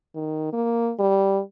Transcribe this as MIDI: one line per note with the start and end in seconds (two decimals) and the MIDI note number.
0.15 0.51 51
0.53 0.92 58
0.99 1.41 55